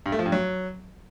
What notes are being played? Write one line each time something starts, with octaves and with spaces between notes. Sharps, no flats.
G2
A3
F3
G2
F#3